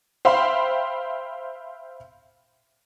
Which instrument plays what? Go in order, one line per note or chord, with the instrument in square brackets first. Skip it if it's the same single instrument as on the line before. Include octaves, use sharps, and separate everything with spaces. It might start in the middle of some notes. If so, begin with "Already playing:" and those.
[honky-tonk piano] C5 E5 F5 G5 B5 C6